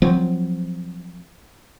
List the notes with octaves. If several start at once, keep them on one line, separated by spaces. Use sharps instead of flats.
F3 F#3 C4